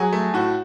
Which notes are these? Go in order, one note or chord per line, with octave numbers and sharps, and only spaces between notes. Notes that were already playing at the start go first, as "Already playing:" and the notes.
Already playing: F#3 G#4
A3
A2 F#4